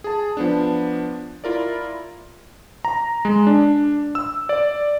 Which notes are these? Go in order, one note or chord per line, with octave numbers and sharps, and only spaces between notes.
G#4 A5
F3 B3 D4
E4 F4 A#4 D5
A#5
G#3
D4
E6
D5